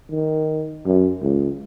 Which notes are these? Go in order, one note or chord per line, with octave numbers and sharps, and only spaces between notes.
D#3
F#2
C#2